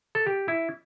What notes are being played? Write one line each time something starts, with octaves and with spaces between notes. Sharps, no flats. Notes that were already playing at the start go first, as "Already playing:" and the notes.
A4
G4
E4